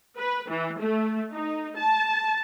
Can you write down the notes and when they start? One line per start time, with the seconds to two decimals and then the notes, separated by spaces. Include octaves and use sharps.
0.19 B4
0.50 E3
0.80 A3
1.32 D#4
1.78 A5